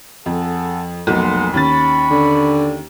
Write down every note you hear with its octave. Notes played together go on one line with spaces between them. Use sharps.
F2 G#4 A4 F#5
F1 B1 A#3 G#4 F#5 C6
D#2 C#4 B5 C#6 A6
D3